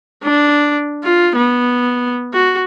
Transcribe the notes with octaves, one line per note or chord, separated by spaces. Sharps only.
D4
F4
B3
F#4